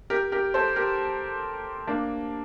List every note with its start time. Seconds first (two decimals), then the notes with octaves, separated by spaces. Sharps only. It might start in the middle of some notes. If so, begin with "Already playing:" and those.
0.10 G4 A#4
0.32 G4 A#4
0.54 A4 C5
0.76 G4 A#4
1.88 A#3 D4